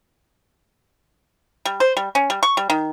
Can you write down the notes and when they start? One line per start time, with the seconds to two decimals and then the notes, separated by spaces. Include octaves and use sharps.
1.65 G3
1.80 C5
1.97 G3
2.15 C#4
2.30 G3
2.43 C#6
2.57 G3
2.70 D#3